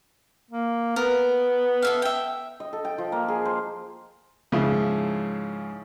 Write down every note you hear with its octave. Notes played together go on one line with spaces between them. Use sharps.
A#3
B3 A#4
A4 E5 F5
E5 G5
D#5
A4
G5
F3
A#3
G#4
C5
G#2 C#3 F3 E4